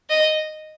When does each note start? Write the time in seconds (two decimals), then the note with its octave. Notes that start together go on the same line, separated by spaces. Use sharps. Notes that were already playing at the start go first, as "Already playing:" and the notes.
0.10 D#5